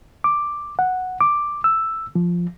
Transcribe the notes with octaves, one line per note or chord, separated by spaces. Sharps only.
D6
F#5
D6
E6
F3